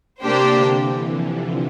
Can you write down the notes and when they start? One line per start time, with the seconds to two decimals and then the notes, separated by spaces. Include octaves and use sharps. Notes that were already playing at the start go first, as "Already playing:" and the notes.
0.21 C3 A#3 D4 G4 C5
0.51 D3
0.81 E3
1.11 F3